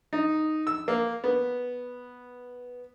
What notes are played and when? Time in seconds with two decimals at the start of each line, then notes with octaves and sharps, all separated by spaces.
0.13 D#4
0.67 E6
0.88 A#3
1.24 B3